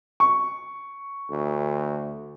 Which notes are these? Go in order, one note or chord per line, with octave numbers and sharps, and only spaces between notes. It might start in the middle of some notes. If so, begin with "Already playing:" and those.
C#6
D2